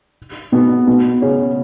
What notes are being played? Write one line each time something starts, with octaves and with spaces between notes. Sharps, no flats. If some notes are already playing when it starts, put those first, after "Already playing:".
B2 B3
B2 B3
C#3 C#4